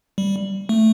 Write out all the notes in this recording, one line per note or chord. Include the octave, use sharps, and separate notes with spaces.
G3
A3